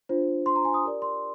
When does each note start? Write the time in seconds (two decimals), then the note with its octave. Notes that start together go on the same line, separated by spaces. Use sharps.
0.09 D4 F4 C5
0.46 C6
0.56 A#5
0.65 G#5
0.74 D#6
0.84 G4 A#4 D5
1.02 C6